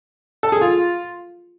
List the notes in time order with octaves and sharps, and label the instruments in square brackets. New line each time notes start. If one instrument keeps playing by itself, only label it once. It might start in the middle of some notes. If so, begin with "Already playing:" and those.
[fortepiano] A4
G#4
F4